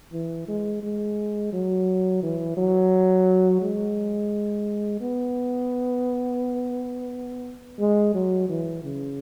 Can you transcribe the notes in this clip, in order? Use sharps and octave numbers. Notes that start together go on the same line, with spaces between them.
E3
G#3
G#3
F#3
E3
F#3
G#3
B3
G#3
F#3
E3
C#3